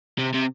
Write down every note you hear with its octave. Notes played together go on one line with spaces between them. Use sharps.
C3
C3